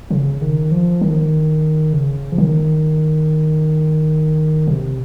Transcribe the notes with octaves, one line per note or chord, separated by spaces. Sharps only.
C#3
D#3
F3
D#3
C#3
F3
D#3
C3